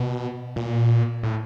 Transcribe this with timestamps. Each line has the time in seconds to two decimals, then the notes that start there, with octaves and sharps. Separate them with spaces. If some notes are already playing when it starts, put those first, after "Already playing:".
Already playing: B2
0.56 A#2
1.23 A2